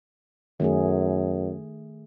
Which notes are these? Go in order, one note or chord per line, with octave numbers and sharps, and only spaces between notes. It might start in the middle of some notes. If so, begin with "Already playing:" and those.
F#2 D#3 A3 G#4